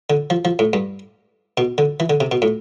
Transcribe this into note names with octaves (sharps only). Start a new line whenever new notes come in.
D3
F3
F3
A2
G2
B2
D3
E3
D3
C3
B2
A2